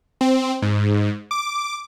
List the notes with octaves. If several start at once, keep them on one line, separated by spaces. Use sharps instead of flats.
C4
G#2
D6